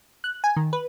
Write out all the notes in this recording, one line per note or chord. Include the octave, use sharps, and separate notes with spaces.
F#6
G#5
D#3
B4